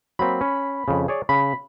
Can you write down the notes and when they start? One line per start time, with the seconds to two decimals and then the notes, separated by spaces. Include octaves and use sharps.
0.19 F#3 A#3 C4 B5
0.41 C#4
0.88 F2 C#3
1.08 G#4 C#5 D5
1.29 C#3 B5